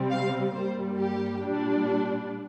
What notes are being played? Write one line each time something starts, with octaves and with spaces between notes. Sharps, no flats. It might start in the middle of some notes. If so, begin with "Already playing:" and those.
Already playing: C3 G3 C4
F5
G2 G3 A#3 C5
G4
A#2 G3 D4